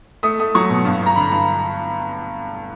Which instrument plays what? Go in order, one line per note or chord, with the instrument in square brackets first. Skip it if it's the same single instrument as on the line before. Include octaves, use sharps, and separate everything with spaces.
[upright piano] A3 D#6
A3 D#6
F#3 C#6
B2
G2
G2
A#5
D3 B5
G2